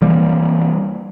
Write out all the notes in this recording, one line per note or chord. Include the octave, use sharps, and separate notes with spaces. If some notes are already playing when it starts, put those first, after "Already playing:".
E3 G3 A#3